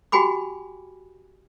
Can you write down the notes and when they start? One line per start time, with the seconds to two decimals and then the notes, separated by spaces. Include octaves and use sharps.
0.12 F#4 G4 G5 G#5 B5 D6